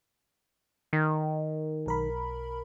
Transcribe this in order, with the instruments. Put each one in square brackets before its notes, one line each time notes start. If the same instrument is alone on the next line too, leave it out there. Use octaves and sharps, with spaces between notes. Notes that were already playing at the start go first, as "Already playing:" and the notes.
[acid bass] D#3
[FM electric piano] B1 A#4 B5